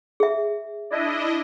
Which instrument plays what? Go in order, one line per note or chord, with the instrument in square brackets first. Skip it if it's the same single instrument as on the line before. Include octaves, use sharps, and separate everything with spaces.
[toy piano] G#4 E5
[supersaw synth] D4 E4 D#5